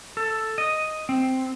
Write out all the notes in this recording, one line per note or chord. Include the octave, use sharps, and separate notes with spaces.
A4
D#5
C4